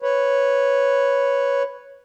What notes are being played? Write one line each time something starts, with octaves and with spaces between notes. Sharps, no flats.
B4 C#5